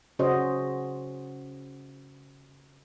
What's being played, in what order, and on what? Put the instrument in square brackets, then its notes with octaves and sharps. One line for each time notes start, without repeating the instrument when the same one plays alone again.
[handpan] C#3 C#4 F#4 C5 D#5